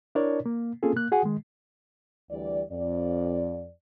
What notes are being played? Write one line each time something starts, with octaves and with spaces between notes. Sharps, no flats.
D4 E4 A#4 C#5 D5
A#3
A#3 C4 C#4 F4 G#4 A4
A#3 F#6
F#4 G#4 F#5 G#5
D#3 G#3
D2 E3 G3 D5
F2 D5